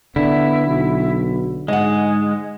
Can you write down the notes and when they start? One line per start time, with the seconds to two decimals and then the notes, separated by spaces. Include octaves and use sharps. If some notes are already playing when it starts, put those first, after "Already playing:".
0.16 D3 B3 E4
0.67 B1
1.68 G#2 G#3 D#5 F#5